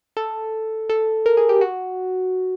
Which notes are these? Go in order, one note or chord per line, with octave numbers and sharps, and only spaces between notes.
A4
A4
A#4
G#4
G4
F#4